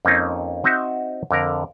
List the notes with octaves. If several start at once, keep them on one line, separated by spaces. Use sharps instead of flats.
F2 A#3 C4 C#4 D#4 F4
C4 D#4 F#4 C5 D#5 E5
F2 D3 A#4